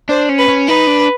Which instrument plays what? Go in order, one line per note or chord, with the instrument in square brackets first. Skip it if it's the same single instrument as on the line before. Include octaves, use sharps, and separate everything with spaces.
[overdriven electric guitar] D4 [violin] C5
[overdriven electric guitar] C#4
[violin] B4
[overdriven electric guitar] C#4
[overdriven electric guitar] D#4 [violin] B4
[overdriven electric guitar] D4